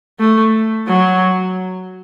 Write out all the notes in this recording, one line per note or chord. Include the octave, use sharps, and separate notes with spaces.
A3
F#3